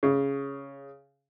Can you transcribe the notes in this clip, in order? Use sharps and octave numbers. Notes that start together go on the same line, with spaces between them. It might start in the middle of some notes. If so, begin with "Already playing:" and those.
C#3